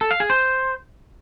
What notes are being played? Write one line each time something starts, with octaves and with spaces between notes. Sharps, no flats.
A4
F5
G#4
C5